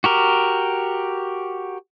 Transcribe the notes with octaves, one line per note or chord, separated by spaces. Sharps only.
F#4 G4 A#4